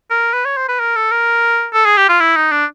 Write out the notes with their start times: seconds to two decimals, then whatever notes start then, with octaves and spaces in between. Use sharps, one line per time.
0.10 A#4
0.34 B4
0.45 C#5
0.57 C5
0.69 B4
0.80 A#4
0.96 A4
1.11 A#4
1.73 A4
1.85 G#4
1.97 G4
2.09 F4
2.20 E4
2.36 D#4
2.52 D4